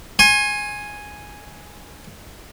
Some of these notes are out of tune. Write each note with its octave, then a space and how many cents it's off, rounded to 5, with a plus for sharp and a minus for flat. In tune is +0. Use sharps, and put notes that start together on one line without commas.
G#5 +0 C6 +45